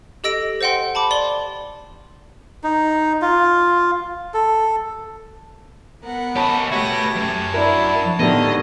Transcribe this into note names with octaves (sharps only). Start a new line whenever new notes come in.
G4 A4 D#5 E6 A#6 D7
C5 D#5 F#5 G5 C6
A5 B5 D6
D5 C6 F#7 G7
D#4
F4
A4
B3 A#4 F#5
C#4 G4 C#5 D#5 A5 B5
A3 F#4 G4 B4 C#5 E5 A5 A#6
F#2
D4 E4 F#4 A#4 D5
A2 D3 D#3 B3 G4 A#4 D#5